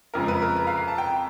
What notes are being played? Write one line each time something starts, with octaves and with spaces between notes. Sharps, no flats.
F2 C#3 F3 G#3 A#4
B4
A#4
B4
F5
F5
A5
G5